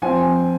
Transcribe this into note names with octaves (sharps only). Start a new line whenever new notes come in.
F3 C4 G#5